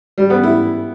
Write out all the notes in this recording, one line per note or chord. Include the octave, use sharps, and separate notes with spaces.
G3
B3
E4